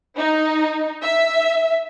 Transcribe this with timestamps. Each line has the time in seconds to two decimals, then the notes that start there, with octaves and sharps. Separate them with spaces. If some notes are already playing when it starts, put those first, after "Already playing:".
0.18 D#4
1.02 E5